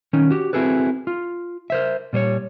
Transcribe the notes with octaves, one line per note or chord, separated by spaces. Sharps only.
D#3 C#4 D#4
F#4 G4
C4 E4 F#4 G#4 A4 B4
F4
A#4 C5 E5
A#2 G3 C5 C#5